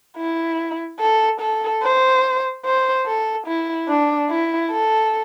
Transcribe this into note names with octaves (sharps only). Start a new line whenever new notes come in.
E4
A4
A4
C5
C5
A4
E4
D4
E4
A4